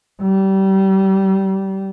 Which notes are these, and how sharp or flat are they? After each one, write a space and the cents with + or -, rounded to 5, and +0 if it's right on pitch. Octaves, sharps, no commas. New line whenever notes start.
G3 -30